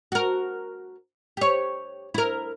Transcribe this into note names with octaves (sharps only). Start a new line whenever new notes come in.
F#4 A#4
G4 C#5
E4 A#4